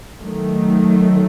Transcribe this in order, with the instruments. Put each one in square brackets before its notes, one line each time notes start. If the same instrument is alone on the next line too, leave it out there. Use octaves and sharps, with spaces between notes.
[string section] D#3 F#3 A3